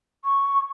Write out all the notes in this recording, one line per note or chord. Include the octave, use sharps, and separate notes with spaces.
C#6